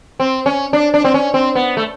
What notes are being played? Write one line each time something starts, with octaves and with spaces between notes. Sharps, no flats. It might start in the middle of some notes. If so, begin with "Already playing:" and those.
C4
C#4
D4
D4
C4
C#4
C4
B3
A3